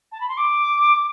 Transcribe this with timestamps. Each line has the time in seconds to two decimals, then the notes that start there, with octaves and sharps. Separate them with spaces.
0.12 A5
0.20 B5
0.28 C6
0.37 D6